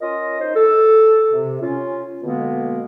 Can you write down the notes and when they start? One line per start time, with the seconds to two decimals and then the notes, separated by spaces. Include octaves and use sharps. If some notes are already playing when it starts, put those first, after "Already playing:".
0.01 C#4 F4 A#4 D#5
0.40 D#4 C5
0.55 A4
1.31 C3
1.61 C#4 F4
2.23 B2 D3 G#3 A#3 B3